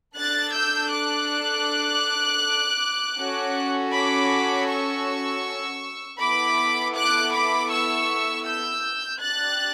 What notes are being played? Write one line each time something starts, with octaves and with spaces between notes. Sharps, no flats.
D4 A4 F#6 A6
E6 G6
D6 F#6
C#4 F#4 A4
B5 D6
C#6 E6
B3 E4 A4 B5 D6
D6 F#6
B5 D6
C#6 E6
E6 G6
D4 G4 F#6 A6